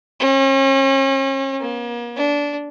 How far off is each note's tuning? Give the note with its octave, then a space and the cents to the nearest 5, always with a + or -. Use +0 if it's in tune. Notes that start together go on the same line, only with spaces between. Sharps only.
C#4 -40
A#3 +40
D4 -20